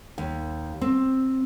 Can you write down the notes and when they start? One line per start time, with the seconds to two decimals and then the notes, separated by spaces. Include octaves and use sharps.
0.18 D#2
0.81 C4